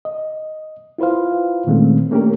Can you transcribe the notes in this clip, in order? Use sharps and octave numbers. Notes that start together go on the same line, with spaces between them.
D#5
E4 F4 B4 C5 F5
A#2 D#3 G#3 A3 C4 C#4
A3 A#3 C#4 D4 G4 A#4